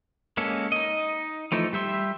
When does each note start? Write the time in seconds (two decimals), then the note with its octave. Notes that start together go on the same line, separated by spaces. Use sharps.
0.37 G#3 A#3 C#4 A4
0.72 D#4 D#5
1.52 E3 F3 A3 D#4
1.73 G3 G4 E5 C6